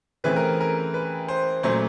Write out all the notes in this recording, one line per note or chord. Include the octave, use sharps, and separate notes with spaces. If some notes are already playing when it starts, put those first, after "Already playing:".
C#3 E3 A3 C4 B4
A#4
A#4
B4
C5
A#2 F#3 A3 C#4 C5